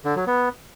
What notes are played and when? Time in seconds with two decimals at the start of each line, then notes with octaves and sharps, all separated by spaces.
0.05 D3
0.16 F#3
0.27 B3